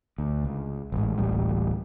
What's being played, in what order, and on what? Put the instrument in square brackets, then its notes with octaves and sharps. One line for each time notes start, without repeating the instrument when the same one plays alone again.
[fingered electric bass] D2
C#2
A1 G#2
D1 A1 G3